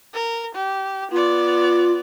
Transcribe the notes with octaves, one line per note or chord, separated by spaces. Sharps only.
A#4
G4
B3 F4 D5